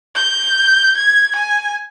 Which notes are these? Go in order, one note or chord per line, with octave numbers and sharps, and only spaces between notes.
G6
G#6
G#5